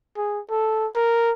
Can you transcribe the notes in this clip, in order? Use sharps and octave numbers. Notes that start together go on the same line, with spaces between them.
G#4
A4
A#4